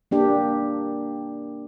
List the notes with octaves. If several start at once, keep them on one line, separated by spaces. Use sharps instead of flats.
A#3 D4 G4